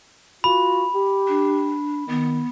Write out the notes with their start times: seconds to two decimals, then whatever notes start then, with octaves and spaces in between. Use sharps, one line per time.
0.44 F4 F#4 B5
0.94 G4
1.28 D4
2.08 D#3 B3